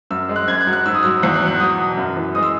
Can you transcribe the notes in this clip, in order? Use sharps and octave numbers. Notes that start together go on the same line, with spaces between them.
F#2 E6
G#3
F#6
F#2 G#6
F#6
F#3
F#6
G#2 E6
D#6
F#3 E6
E2 F#6
F#6
F#3
F#6
F#3 D#6
B2
F#2
E3
G#3 D#6
E6